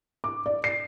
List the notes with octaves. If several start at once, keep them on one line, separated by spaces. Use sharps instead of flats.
D6
D5
C7